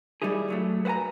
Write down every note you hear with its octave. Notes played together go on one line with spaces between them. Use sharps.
G3 D#4 E4 G4 G#4
G2 F#3 A3
B4 C5 F#5 G#5 A#5